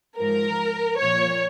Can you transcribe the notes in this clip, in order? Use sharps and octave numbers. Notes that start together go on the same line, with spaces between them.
G#2 F3 A#4
A#2 F3 C#5